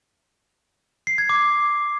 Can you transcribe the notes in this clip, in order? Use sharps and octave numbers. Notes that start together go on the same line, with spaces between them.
C7
G#6
D6